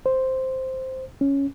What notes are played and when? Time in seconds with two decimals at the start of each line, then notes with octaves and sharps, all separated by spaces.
0.06 C5
1.21 C#4